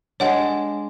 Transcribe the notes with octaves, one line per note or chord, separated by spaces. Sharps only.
G#3 D4 C#5 F#5